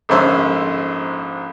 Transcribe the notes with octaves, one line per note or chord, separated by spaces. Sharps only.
A#1 G#2 D3 C#4 C5 E5